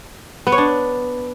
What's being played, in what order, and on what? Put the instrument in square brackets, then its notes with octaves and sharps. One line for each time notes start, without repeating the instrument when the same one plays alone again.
[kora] B3
C#5
D4